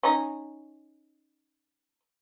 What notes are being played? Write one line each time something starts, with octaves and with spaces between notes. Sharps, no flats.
C#4 D#4